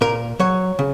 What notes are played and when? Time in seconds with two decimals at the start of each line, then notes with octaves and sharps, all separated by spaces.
0.01 A#2 A#4
0.40 F#3 C#5
0.79 C#3